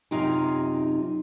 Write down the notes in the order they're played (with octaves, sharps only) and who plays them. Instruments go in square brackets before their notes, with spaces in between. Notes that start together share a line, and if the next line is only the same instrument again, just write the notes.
[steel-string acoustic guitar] F#2 C3 D#4 F4 G5 G#5